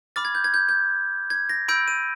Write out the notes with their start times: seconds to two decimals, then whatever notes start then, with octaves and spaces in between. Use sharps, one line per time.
0.16 B5 D6 F6 A6
0.25 G#6
0.35 G6
0.44 G#6
0.54 G6
0.69 G6
1.30 G#6
1.49 A#6
1.68 B5 E6 G6 D7
1.88 D#7